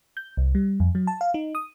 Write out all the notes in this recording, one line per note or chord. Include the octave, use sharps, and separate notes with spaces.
G6
C2
G3
F2
F#3
A5
F5
D#4
D#6